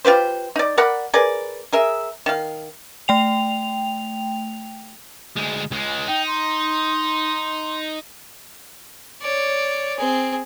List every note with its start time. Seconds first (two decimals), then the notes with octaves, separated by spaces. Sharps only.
0.05 F4 G4 B4 C5
0.56 D#4 D5
0.78 A#4 D5 F#5 B5
1.14 G#4 A#4 B4 D5
1.73 G#4 A#4 E5
2.26 D#3 F5
3.08 A3 G5 F7
5.36 D2 G#3
5.71 C#2 G#3
6.08 D#4 G5
6.27 C6
9.21 C#5 D5
9.98 C4 G#4